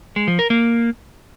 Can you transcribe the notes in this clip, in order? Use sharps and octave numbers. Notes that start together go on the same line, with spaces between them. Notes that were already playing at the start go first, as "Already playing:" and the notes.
G#3
F3
A#4
A#3